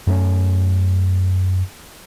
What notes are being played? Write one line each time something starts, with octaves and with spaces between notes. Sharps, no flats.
F#2 A3 B3 C#4